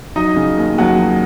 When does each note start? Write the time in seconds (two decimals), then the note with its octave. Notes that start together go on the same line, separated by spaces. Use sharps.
0.16 F#3 D#4 D#5
0.36 C#3
0.57 D#2
0.78 D#2 F#3 F#4
0.99 F#3